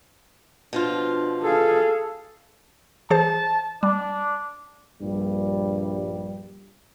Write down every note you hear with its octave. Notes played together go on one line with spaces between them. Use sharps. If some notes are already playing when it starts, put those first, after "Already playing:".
B2 F3 D4 F4
G#4 A4 F5
E3 G#4 C5 A5
G3 D4
A#1 G2 G3